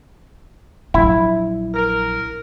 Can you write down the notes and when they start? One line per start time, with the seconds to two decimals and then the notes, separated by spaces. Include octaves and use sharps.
0.94 A#1 F#3 E4
1.74 A#4